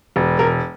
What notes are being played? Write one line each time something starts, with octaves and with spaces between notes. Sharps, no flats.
E1
E1 A#4